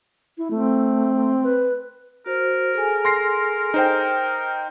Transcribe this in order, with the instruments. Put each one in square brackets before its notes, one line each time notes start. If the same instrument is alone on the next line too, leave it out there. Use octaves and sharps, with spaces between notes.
[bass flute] E4
[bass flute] A3 [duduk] C4
[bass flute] B4
[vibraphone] F#4 C5 [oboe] A#4
[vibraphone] G#4 A4 G#5
[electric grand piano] C6 A#6 C7
D#4 C5 G5